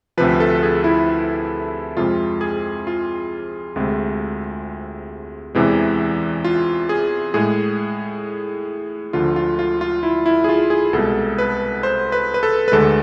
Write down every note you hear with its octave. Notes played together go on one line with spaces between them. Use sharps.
D2 C3 F3 B4
A4
G#4
E4
F2 C3 G#3 F4
G#4
F4
D2 C3 G#3
E2 C3 E3 G#3
F4
G#4
A2 G#3 G#4
D2 D3 F3 F4
F4
F4
F4
E4
E4
G#4
F4
G#4
C2 B2 G#3 A4
B4
C5
B4
B4
A4
B4
D2 D3 G#3 A4